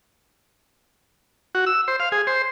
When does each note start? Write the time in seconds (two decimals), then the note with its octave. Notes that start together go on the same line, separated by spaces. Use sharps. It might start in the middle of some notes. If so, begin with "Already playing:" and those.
1.55 F#4
1.67 E6
1.88 C5
2.00 F5
2.12 G#4
2.27 C5